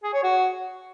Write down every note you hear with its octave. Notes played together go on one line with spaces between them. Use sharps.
G#4
C#5
F#4